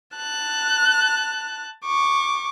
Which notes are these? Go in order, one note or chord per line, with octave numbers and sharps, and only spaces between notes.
A5 F#6
C#6 D6